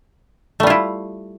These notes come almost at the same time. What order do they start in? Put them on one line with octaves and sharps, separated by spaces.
A3 G3 F4 E4